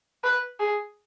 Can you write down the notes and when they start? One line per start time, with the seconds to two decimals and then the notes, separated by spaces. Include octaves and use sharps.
0.24 B4
0.60 G#4